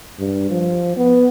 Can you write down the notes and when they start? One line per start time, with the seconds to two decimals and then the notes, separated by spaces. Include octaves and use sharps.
0.19 G2
0.50 F3
0.97 B3